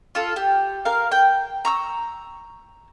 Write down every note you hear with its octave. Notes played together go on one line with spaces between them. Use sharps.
F4 A4
G4
A#4 F5
G5
A#5 C#6 E6